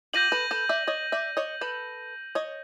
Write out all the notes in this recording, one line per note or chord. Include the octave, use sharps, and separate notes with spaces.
F4 G4 G6 A#6 D#7 F#7
A4 B4
A4 B4
D5 E5
C#5 D#5
D5 E5
C#5 D#5
A4 B4
C#5 D#5